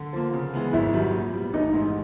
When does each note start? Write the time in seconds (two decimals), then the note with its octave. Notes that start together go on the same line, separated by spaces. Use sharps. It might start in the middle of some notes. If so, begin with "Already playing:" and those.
Already playing: D3
0.13 F3 A#3
0.33 C#3
0.53 E3 G#3 B3
0.73 G#1 E4
0.93 F#2 D#3 G3
1.14 A#2
1.33 G3 B3
1.53 A1 D#4
1.73 G#2 E3